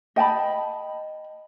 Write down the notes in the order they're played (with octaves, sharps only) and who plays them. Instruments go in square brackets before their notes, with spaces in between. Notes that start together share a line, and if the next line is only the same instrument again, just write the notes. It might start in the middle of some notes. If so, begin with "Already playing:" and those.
[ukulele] D#5 G5 A5 B5